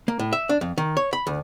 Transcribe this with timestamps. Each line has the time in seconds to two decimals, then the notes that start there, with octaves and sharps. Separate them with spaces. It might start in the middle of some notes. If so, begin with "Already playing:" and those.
0.08 A#3
0.19 A2
0.33 E5
0.49 D4
0.61 F2
0.78 D#3
0.97 C#5
1.13 B5
1.27 D2